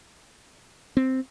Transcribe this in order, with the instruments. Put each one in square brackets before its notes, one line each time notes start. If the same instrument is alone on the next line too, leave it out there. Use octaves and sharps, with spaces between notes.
[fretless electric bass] C4